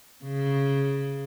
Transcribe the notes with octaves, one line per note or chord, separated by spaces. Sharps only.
C#3